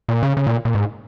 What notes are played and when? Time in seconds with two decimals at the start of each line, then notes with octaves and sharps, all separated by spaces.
0.09 A#2
0.23 C#3
0.37 C#3
0.47 A#2
0.65 A#2
0.75 G#2